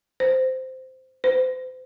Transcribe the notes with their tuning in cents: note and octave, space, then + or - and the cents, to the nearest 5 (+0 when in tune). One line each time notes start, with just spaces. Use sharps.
C5 -10
C5 -35